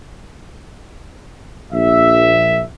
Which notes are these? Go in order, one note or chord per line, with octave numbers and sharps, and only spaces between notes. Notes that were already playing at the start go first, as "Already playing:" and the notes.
A#1 E5